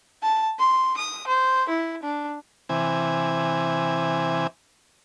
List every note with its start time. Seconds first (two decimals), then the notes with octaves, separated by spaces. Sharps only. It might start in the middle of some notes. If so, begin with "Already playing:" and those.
0.22 A5
0.59 C6
0.97 D#6
1.27 C5
1.69 E4
2.03 D4
2.69 C3 E3 G#5